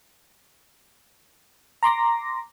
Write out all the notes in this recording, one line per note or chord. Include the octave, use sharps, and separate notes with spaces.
A#5 C6 D6 A#6